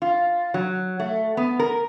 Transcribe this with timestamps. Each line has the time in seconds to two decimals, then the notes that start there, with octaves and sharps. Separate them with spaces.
0.02 F4
0.54 F#3
0.99 A3
1.37 B3
1.59 A#4